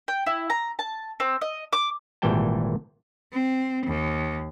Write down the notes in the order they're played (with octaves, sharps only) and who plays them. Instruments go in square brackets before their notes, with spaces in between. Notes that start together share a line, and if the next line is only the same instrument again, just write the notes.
[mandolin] G5
E4
A#5
A5
C4
D#5
D6
[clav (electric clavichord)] G#1 A#2 E3 G3 G5 A5
[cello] C4
D#2